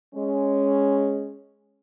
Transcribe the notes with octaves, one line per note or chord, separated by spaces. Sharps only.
G#3 C#4